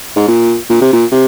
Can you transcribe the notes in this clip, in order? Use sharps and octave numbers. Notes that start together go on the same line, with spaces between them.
G#2
A#2
A#2
C3
A#2
C3